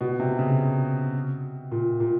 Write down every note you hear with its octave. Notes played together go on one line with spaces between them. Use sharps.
B2
C3
C#3
A#2
A#2